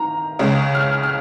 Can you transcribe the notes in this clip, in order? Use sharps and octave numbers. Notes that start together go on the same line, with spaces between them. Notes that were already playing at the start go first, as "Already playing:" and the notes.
Already playing: D#3 A#5
C#2 C#3 G#3
F6
F6